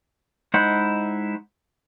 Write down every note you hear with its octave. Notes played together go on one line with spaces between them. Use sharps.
G#3 D#4 E4 C5 F#5